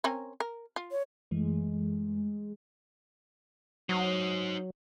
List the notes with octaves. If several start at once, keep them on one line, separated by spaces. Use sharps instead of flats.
C4 C#4 A#4
A#4
F4
C#5
F#2 E3 G#3 A3
F#3 D#4 C5